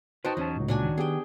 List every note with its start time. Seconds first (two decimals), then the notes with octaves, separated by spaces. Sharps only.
0.25 D#4 F#4 B4 C5 G5 A5
0.37 E2 F#3 C#4 A5
0.56 C#2 A2
0.68 A#2 F#3 D4 G#5
0.83 D#3
0.98 B3 G4 G#4 G5